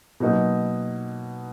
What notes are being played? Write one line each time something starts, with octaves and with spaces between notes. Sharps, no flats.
B2 F#3 A#3 D#4